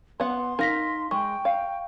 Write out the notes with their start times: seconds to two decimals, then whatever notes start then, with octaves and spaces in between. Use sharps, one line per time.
0.20 B3 F#5 C6
0.59 D#4 A#4 F5 A#6 B6
1.11 G#3 G5 C#6
1.45 F5